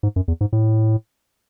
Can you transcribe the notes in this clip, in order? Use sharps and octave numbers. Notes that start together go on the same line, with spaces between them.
G#2
F#2
E2
G#2
A2